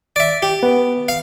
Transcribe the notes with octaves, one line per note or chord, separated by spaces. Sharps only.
D5 E5
G4
B3
F5